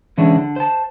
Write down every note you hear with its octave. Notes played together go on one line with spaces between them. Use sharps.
D3 E3 G#3 C#4 D4
D3
C5 A5